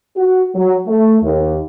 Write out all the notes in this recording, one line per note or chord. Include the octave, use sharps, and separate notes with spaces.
F#4
F#3
A3
D#2